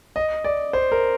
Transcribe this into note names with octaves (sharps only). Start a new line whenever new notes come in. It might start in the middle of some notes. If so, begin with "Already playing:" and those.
D#5
D5
C5
A#4